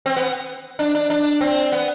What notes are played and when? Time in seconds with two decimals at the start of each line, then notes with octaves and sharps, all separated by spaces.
0.06 C4
0.16 B3
0.79 D4
0.95 D4
1.10 D4
1.41 C4
1.72 B3